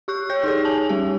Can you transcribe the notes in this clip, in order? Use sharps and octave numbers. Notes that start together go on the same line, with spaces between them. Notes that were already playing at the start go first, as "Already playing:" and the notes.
G4 C#6 F#6
G4 C#5 G6
D#4 G#4 C#5
G#5 A5
G3 G4